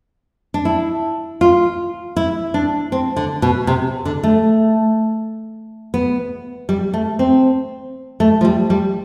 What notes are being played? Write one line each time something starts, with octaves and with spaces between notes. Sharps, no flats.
D4
E4
F4
E4
D4
C4
D3
B2
C3
D3
A3
B3
G3
A3
C4
A3
F3
G3
G3